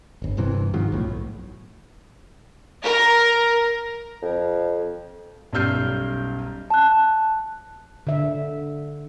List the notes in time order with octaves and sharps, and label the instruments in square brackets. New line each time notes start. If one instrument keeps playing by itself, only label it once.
[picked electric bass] D1 G1
F#1 G2 C3 E3
G#2 D#3 F3 F#3
B1 F#2 A2
[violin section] A#4
[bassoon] F2
[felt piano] B1 F#2 G3 F6 G6 C7
[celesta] A5 F#6
[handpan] D3 E5